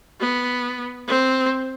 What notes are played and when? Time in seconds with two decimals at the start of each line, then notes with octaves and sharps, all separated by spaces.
0.20 B3
1.07 C4